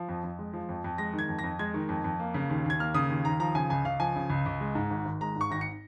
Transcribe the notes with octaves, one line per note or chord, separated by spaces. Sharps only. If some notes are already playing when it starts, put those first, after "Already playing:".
Already playing: F3
F2
F2
G#3
F3
F2
F2
G#3 A#6
D#3
G#6
F2
A#6
F2
G#3 G#6
D#3
F2
F2
A#3
C#3
D#2
D#2
G#6
A#3 F6
C#3 D#6
D#2
D#2 A#5
F3 A#5
C#3 G#5
C#2 G#5
C#2 F5
F3 G#5
C#3
C#2
C#2
G#3
G#2
G#1
G#1
G#3 A#5
G#2 C#6
G#1 A#6
C#7